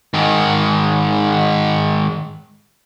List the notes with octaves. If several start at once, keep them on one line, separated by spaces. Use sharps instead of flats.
G#2 D#3